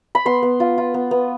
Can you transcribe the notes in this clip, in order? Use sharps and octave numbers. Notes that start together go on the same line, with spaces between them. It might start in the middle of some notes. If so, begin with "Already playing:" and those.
B5
B3 C6
B3
F4
F4
B3
B3